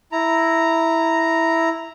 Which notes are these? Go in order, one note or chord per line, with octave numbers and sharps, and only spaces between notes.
E4 A#5